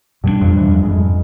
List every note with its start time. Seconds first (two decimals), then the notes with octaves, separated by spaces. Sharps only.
0.24 G2 B2 G3 B3 D4
0.41 F2
0.57 E2
0.66 F2
0.74 F#2
0.83 G#2
0.91 F2